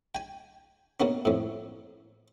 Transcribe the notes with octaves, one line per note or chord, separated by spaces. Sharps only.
G5 G#5
B2 A#3 B3 C#4
F2 A2